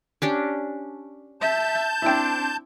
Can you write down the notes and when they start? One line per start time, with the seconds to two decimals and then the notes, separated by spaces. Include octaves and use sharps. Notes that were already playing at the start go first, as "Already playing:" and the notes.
0.22 C#4 D4 G4
1.41 E5 A5 G6
2.02 C4 D4 E4 G5